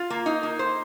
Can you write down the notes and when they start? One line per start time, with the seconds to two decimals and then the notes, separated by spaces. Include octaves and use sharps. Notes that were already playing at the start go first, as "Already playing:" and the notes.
Already playing: F4
0.10 A#3
0.26 D#4
0.43 A#3
0.59 C5